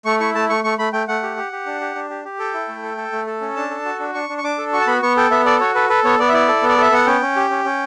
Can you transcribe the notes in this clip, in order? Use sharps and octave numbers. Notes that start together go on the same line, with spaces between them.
A3 C#6
E4 C#6
A3 A5
A3 C#6
A3 C#6
A3 B5
A3 G5
A3 F#5
G4
G4
G4
D4
G4
D4
G4
G4
A4 G5
E4
A3
A4
A4
A3
A4
C#4
D4 A5
A4
F#4
D4
D4 C#6
D4
C#6
D4 D6
A4
F#4 C#6
A5
B3 B5
B3 C#6
A4 G5
B3 E5
A4 D5
F#4 C#5
A4 B4
A4 B4
B3 C#5
B3 D5
E5
E4 D5
A4
B3
D5
A4 E5
B3 F#5
C#4 G5
C#4
G4
C#4
C#4